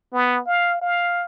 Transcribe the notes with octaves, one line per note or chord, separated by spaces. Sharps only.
B3
F5
F5